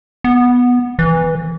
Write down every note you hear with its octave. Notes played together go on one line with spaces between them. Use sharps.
B3
E3